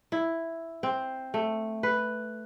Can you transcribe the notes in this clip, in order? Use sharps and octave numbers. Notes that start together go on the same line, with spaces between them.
E4
C4
A3
B4